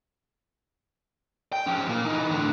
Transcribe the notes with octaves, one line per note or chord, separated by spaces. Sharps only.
G5
F3 C#4
A#2 A#3
E3 D#4
A2 D3